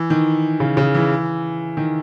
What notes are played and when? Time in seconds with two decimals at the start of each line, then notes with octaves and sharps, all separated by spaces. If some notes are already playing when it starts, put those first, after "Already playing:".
Already playing: E3
0.10 D#3
0.60 C#3
0.77 C#3
0.94 E3
1.77 D#3